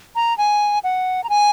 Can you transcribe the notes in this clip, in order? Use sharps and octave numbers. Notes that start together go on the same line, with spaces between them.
A#5
G#5
F#5
A#5
G#5